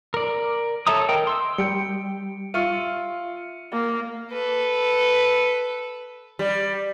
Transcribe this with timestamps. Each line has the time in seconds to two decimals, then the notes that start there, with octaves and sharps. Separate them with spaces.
0.14 A#4 D5
0.87 A4 C#5 E5 A#5 D#6
1.09 A#4 D#5 G5
1.27 C6 E6
1.58 G3 G4 G5 C#7 D7
2.54 F4 E5 C#6 E6 F6 C#7 D#7
3.73 A#3
4.31 A4 B4
6.39 G3